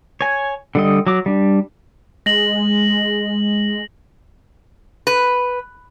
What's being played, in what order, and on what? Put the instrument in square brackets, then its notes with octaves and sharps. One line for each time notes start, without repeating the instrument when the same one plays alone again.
[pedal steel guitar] C#5 G#5
D3 G3 D#5
F#3 D6
G3 D4
[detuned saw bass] G#3 [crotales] A#6 F#7
[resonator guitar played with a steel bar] B4